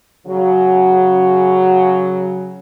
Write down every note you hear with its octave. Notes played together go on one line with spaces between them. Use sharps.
C#3 F#3